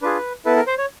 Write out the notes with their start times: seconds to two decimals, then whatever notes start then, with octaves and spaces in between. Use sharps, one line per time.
0.02 D4 F4 G#4 B4
0.45 B3 E4 A4 B4
0.56 A#4
0.67 C5
0.78 C#5